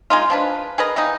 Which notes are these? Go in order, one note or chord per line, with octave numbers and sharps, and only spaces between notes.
G#3 A#3 D#4 F4
F3 D4 B4
G#4 A#4 B4 D#5
D#3 E3 A#3 D#4